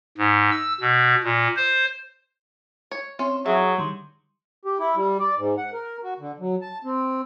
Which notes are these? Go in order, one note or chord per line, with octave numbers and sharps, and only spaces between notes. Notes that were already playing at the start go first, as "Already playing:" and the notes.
G#2
E6
B2
A#2
C5
C#5
C4 C#4 E4 C6
F#3 G#4 E5
D3 D#3 G3 C6
G4
E4
G3
D5
G#2
F#5
A#4
F#4
D3
F#3
A5
C4